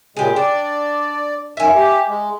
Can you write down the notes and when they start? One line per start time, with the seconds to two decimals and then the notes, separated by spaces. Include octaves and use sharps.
0.16 A#2 C#3 G#3 G4 G#4
0.36 D4 D5
1.57 F#2 D#3 E5 G#5
1.75 G4
2.08 G#3